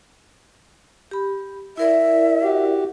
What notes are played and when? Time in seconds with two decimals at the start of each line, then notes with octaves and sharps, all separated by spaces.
1.11 G4 B5
1.77 E4 A#4 D5 E5
2.43 F#4 G4